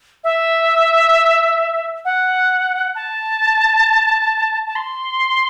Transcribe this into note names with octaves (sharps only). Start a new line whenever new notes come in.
E5
F#5
A5
A5
C6